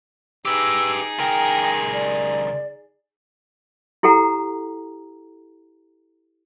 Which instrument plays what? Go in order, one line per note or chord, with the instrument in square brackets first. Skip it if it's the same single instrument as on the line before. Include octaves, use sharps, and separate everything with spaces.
[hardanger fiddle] D#4 G#4 [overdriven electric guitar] G4 B4 [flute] E6
[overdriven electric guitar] C#2 A#4 [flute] G5
[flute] D5
[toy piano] E4 G4 A4 F#5 A#5